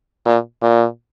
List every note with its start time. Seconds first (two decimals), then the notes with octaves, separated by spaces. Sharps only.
0.26 A#2
0.62 A#2